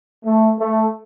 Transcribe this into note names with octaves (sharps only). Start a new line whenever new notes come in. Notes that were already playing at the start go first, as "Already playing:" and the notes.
A3
A3